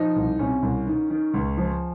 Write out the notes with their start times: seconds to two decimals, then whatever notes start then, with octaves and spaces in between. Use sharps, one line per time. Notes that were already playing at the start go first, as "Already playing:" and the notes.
Already playing: F3 D#4
0.16 C2
0.39 C3 C#4
0.63 C2
0.87 D#3
1.10 D#3
1.34 C#2
1.57 F3